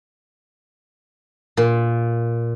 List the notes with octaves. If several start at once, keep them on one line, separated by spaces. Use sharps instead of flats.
A#2